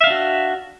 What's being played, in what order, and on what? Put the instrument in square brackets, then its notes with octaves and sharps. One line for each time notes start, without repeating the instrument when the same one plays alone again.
[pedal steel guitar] E5
F5
D4
F#4